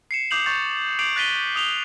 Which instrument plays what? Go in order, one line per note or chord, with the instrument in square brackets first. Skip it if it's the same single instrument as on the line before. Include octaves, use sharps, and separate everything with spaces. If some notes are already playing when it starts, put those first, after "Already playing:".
[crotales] C7 C#7 E7
D6 D#6 G6 C7 F7 F#7
C#6 G6 A6
D6 G6 C7 D7 F7 F#7
F#6 A6 B6 D#7 G7
D#6 F7 G7